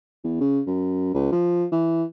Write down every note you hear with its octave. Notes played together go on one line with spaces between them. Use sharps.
E2
C#3
F#2
C#2
F3
E3